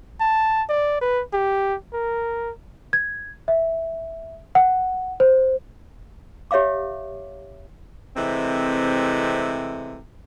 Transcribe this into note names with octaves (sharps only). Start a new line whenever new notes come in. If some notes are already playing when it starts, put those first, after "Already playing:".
A5
D5
B4
G4
A#4
G#6
E5
F#5
C5
G4 C#5 E5 F5 D6
C3 E3 G#3 A3 C4